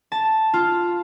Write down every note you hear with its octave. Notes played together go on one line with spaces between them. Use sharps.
A5
F4